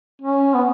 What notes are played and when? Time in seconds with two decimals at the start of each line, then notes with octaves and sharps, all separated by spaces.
0.22 C#4
0.54 B3